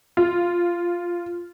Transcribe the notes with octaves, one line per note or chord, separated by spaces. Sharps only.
F4